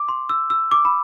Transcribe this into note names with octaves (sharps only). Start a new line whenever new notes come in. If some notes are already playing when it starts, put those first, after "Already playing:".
Already playing: D6
C6
E6
E6
D6
B5